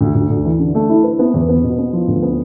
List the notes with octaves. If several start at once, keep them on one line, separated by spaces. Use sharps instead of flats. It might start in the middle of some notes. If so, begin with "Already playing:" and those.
D2
D2
D2
E3
D3
A3
E4
B4
B3
E2
B3
B2
B3
F3
D2
B3